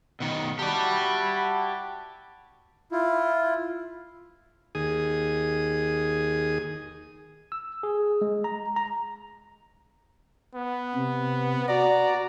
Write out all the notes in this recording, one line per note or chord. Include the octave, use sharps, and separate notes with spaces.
B2 D#3
E4 F#4 G4 D5 A5
E4 F4
D#2 G#4 D#6
E6
G#4
G#3
A#5
A#5
B3
C3
F#4 D5 A#5